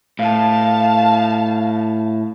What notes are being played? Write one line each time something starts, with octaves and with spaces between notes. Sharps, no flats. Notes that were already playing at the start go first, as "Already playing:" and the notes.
A2 F5 A5